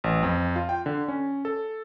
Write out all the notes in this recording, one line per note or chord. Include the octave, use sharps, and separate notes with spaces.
A1
F2
F4
G5
D3
C#4
A4